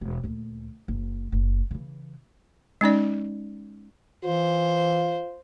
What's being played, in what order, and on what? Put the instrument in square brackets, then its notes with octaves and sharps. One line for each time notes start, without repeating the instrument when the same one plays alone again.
[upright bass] E1
D2 A#2
F#1
F#1
C#3 E3
[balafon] G#3 C#4 D#4 D5
[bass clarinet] E3 [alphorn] F4 [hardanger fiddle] C5